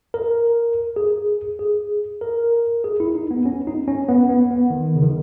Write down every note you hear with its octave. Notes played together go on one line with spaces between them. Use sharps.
A#4
G#4
G#4
A#4
G#4
E4
D#4
B3
C#4
D#4
C#4
B3
B3
B3
D#3
C#3
D#3